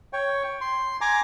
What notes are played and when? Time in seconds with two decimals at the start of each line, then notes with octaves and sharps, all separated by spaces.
0.13 C#5 G5
0.61 C6
1.01 G#5 A#5 D6